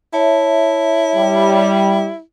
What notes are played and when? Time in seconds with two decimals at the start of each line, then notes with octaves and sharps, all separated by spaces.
0.13 E4 C#5 E5 A5
1.15 G3